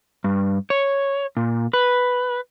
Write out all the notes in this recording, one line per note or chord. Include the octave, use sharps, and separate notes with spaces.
G2
C#5
A#2
B4